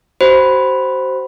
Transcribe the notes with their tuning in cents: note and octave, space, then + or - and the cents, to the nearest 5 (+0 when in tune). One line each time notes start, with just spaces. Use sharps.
F#4 +40 C5 +0 B5 +0